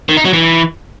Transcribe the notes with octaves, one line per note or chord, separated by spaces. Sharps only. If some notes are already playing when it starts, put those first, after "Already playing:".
D#3
D#4
F#3
E3